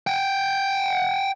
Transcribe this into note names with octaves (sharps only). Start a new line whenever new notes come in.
F#5 G5